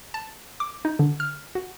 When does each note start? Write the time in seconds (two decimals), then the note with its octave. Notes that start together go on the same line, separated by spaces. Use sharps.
0.14 A5
0.60 D6
0.85 D#4
0.99 D3
1.20 F6
1.55 F#4